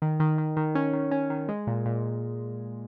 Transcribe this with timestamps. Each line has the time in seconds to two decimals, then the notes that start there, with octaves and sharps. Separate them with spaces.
0.02 D#3
0.20 D#3
0.38 D#3
0.57 D#3
0.75 C#4
0.93 D#3
1.11 C#4
1.30 D#3
1.49 G#3
1.67 A#2
1.86 A#2